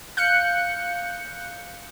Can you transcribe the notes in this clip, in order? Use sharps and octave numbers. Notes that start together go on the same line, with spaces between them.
F5 F#6 G6 C#7